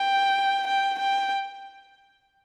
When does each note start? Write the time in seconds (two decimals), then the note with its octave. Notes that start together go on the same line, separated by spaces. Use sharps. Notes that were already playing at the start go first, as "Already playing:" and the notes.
Already playing: G5
0.67 G5
0.99 G5